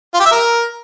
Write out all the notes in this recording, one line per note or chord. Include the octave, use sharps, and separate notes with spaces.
F4
G4
E5
A#4